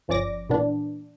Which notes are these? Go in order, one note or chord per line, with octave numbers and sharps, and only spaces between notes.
G1 F3 C#4 D5 D6 A#6
A#2 E3 B3 D4